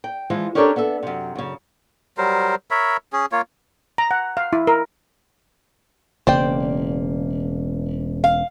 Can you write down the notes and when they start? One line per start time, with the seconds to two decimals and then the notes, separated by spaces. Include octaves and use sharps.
0.04 G5
0.30 E3 F3 G#3
0.55 C#4 D4 G4 A4 A#4 C#5
0.76 B3 D4 A4 E5
1.03 F#2 C3
1.36 F#2 C#3
2.18 F#3 G3 A#4 C5
2.71 A#4 C#5 E5 B5
3.13 C#4 G#4
3.32 A#3 F4 C#5
3.98 A#5
4.11 F#5
4.37 F5
4.53 E4
4.67 A#4
6.27 E1 C#3 A#3 C5 D5 G5
8.24 F5